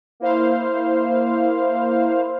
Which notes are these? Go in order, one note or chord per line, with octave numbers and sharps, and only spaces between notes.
A#3 E4 C5 F5